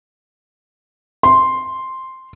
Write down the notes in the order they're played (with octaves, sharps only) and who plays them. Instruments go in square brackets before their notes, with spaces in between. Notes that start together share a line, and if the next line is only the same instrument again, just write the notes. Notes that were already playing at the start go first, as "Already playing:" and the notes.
[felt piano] C6